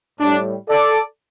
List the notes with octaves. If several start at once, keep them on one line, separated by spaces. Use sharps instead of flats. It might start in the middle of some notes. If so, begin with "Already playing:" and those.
A2 G3 D4
A4 D5